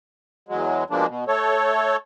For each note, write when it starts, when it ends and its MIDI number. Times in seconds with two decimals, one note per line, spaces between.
0.49 0.84 40
0.49 0.84 54
0.49 0.84 56
0.90 1.06 47
0.90 1.06 53
0.90 1.06 56
0.90 1.06 58
0.90 1.06 62
1.08 1.24 47
1.28 1.97 57
1.28 1.97 69
1.28 1.97 73